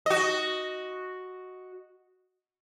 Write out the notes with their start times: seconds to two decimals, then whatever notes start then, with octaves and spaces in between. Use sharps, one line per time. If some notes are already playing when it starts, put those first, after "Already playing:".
0.06 F#4 D#5